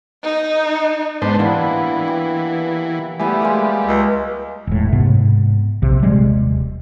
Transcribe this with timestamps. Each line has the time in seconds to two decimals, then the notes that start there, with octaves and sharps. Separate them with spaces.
0.24 D#4
1.22 G#2 B3 D4 C5
1.39 E3 G3 A#3 B3
2.08 G4
3.19 G3 A3 B3 G#4
3.42 G#3 A#3
3.85 C#2
4.67 E1 A2
4.92 G#2 C3 B3
5.82 A#1 C3
6.02 D#1 C3 G3 G#3